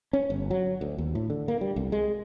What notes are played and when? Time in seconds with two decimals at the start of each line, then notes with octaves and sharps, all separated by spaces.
0.13 C#4
0.30 G1
0.51 F#3
0.81 D2
0.98 D#2
1.15 A2
1.30 D3
1.48 A#3
1.61 G3
1.76 C2
1.92 G#3